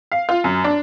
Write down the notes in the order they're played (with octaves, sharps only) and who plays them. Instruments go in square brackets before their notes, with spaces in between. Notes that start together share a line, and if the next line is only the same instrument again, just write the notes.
[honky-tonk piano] F5
F4
F#2
D4